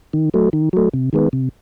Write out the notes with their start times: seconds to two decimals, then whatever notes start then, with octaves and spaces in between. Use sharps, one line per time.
0.13 D#3
0.34 F#3 A3
0.53 D#3
0.73 F#3 A3
0.94 C3
1.13 D#3 G#3 B3
1.33 C3